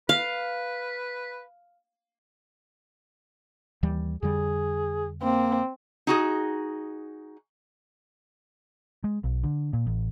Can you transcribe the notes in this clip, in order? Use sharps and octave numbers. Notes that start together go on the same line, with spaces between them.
B4 F5
D#2 E3 G3
F2 D3 G3 G#4
A#3 C4
D#4 F#4 G#4
G#3
B1
D3
A#2
A1